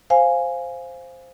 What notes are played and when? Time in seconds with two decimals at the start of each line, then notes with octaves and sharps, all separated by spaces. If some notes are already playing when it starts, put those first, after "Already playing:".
0.10 C5 F5 G#5